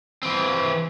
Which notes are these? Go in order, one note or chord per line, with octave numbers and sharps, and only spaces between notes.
E3 C4